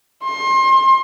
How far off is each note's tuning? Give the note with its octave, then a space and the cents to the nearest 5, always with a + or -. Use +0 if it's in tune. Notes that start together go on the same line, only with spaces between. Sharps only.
C6 +30